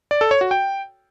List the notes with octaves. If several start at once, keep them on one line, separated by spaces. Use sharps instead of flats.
D5
A4
C#5
F#4
G5